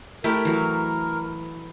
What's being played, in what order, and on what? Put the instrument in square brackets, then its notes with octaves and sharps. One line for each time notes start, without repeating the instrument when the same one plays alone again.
[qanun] A3 E4 G4 [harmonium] A#4
[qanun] E3 F#3